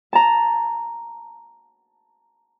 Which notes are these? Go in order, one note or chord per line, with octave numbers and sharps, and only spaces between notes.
A5 A#5